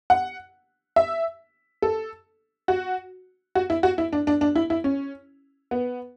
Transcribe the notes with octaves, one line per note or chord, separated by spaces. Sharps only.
F#5
E5
A4
F#4
F#4
E4
F#4
E4
D4
D4
D4
E4
E4
C#4
B3